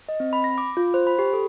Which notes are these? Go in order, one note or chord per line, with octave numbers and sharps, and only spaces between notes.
D#5
C4
B5
A#6
D6
F4
C5
B5
G4
A4